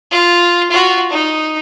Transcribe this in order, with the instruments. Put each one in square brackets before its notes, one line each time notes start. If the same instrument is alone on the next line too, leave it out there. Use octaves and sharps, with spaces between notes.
[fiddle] F4
F4 F#4
D#4